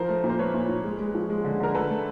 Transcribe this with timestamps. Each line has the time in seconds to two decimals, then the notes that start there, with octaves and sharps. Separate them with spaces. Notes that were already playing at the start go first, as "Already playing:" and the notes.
Already playing: F3 A#4 C5
0.09 A3
0.24 A#2
0.29 C5
0.39 A3 B4 C#5
0.54 A#2
0.69 A#2
0.84 G#3
0.99 G#3
1.15 F3
1.30 G#3
1.44 D3
1.60 D3 A#4
1.75 A3 A4 B4
1.90 A3